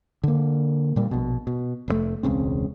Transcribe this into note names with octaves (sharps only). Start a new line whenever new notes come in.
D3 A#3
A#2 G3 A#3
A#1 B2
B2
F1 C3 A3
E1 C#2 C#3 C4